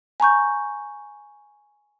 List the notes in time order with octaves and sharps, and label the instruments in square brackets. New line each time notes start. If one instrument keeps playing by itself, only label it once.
[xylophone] G#5 A#5 C#6 G6